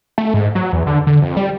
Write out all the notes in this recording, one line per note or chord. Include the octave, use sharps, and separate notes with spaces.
A3
G#2
F#3
E2
D3
D3
F2
G3